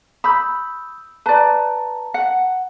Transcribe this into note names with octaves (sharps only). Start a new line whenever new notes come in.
B5 D#6 E6 G6
B4 D5 A5 A#5
F#5